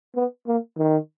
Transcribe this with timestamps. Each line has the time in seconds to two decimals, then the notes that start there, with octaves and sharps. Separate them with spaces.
0.16 B3
0.47 A#3
0.78 D#3